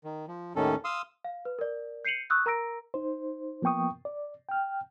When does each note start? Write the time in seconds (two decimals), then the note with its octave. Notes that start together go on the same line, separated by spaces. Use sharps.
0.04 D#3
0.28 F3
0.56 D#2 A2 D#3 C#4 A4
0.84 F5 C6 D#6 E6
1.24 F5
1.45 B4
1.59 A#4 D5
2.05 G6 C7 C#7 D#7 F7 F#7
2.30 C#6 D#6 E6 F#6 G6
2.46 A#4 A#5 E6 A#6 D7
2.94 D#4 C5
3.62 F3 A#3 B3 G5 C#6 D#6
4.05 D5
4.49 G5 F6